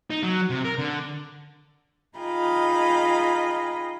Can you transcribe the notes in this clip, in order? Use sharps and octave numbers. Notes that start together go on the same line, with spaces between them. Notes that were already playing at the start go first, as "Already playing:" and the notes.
D#4
F#3
C3
A#4
D3
D#4 F4 G#4 D#5 G5 B5